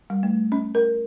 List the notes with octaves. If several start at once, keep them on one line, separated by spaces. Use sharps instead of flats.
G3
A3
C#4
A#4